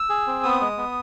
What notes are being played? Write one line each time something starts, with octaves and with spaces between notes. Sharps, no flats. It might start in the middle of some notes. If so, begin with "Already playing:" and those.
Already playing: E6
G#4
C4
B3 D#6
G#3
B3